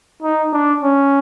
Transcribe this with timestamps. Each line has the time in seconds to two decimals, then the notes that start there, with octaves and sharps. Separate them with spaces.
0.22 D#4
0.53 D4
0.83 C#4